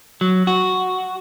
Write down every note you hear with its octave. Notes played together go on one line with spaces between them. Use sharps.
F#3
F#4